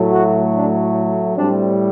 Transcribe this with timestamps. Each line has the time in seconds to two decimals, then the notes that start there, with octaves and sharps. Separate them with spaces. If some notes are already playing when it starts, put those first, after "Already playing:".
Already playing: A2 F#3 A3
0.10 F#4
0.53 D4
1.36 A2 G3 C4 D4